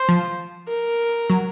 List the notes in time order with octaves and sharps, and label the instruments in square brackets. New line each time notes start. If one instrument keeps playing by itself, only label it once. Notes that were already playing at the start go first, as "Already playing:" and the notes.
Already playing: [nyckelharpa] C5
[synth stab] F3
[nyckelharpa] A#4
[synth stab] F#3